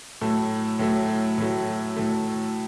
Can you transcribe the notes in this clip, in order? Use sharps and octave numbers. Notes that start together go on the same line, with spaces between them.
A2 F#3 A3
A2 F#3 A3
A2 F#3 A3
A2 F#3 A3